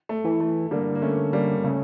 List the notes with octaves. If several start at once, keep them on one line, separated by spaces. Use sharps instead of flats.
A3
E3
A3
D3 G3 A#3
A#3
A3 C#4
G3 A#3
C#3 A3